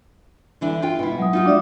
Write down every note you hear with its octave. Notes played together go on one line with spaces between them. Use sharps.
D3 E3 D4
F4 G5
B2 E4
F#3 G#3 D#6
D#4 F4 F#4
D4 D5 E5